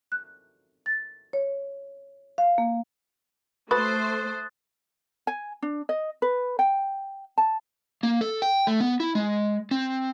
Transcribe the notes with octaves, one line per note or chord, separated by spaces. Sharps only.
F#6
A6
C#5
F5
A#3
A3 F#4 A4 B4 C5 D#6 F#6 A6
G#5
D4
D#5
B4
G5
A5
A#3
A4
G5
A3
B3
E4
G#3
C4